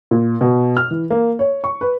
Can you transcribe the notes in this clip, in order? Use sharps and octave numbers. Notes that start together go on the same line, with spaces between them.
A#2
B2
F6
E3
A#3
C#5
C#6
B4